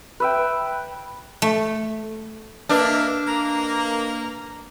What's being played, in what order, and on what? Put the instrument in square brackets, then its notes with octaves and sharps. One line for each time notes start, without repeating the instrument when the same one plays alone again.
[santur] B4 E5 G5
[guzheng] A3
[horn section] A#3 E5 [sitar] D4 [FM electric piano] B4 D#5 [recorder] F6
[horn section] A#3 [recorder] A#5